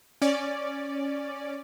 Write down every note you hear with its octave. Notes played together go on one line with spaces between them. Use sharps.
C#4 D5